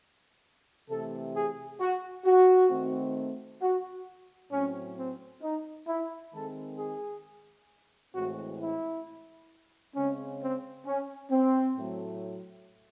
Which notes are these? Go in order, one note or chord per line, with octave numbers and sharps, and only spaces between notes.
C3 E3 A3 A4
G#4
F#4
F#4
D#3 A3 C4
F#4
A2 F#3 C4 C#4
C4
D#4
E4
D#3 G#3 C4 A4
G#4
A2 E3 G#3 C4 F#4
E4
C#3 G#3 C4 C#4
C4
C#4
C4
A2 F#3 A3